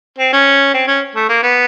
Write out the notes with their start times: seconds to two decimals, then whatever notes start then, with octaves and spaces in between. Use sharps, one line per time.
0.18 C4
0.32 C#4
0.74 C4
0.87 C#4
1.15 A3
1.29 A#3
1.42 B3